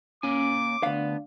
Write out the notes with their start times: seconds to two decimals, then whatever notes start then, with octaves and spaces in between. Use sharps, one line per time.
0.23 A#3 C#4 G#5 D6
0.83 D2 B3 D4 F5